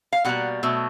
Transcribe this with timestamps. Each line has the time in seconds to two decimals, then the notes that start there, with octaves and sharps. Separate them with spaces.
0.12 F5
0.25 B2 G3 A#3 F#5
0.63 B2 F#3 A3